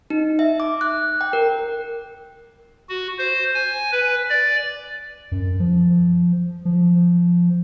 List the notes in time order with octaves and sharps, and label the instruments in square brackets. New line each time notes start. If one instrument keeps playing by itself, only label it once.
[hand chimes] D#4
E5
D6
F#6
G5
A#4
[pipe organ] F#4
C5
G#5
B4
D5
[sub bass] F#2
F3
F3